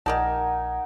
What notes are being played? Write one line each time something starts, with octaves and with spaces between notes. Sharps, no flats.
A#1 D#3 D#4 A#4 D5 F#5 G#5 A5